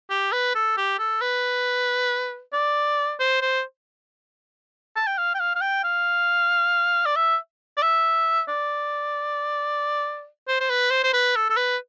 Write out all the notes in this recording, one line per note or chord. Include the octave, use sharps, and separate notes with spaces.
G4
B4
A4
G4
A4
B4
D5
C5
C5
A5
G5
F5
G5
F5
F5
G5
F5
D5
E5
D5
E5
D5
C5
C5
B4
C5
C5
B4
A4
A4
B4